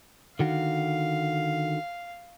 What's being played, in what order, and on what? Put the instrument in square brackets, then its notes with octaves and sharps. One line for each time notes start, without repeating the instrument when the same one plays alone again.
[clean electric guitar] D3 D#3 F#4 [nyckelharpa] F5